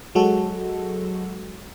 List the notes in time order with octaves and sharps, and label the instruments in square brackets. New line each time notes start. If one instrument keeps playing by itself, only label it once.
[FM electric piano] F#3 G#3 F#4 A4